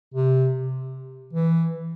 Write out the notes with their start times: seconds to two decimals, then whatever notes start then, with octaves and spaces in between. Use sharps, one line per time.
0.14 C3
1.33 E3